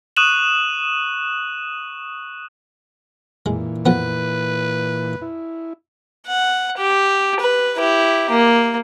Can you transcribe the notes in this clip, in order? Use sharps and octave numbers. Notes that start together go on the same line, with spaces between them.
C#6 D#6 F#6 D#7 E7 F#7
A#2 E3 G#3
F2 F3 B3 B4
E4
F#5
G4
B4
E4 G4
A#3